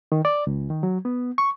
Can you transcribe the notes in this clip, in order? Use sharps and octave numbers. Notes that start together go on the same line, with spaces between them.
D#3
D5
C#2
D#3
F#3
B3
C#6